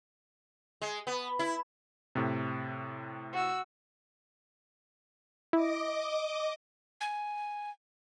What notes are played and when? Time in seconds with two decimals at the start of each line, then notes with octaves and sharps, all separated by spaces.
0.82 G#3
1.07 B3
1.39 E4
2.15 A2 C3
3.33 F#4 E6
5.53 E4 D#5 D6
7.01 G#5